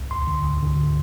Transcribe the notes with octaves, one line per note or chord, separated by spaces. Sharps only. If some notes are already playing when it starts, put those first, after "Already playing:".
Already playing: C2
D2 C6
D3
D2
D3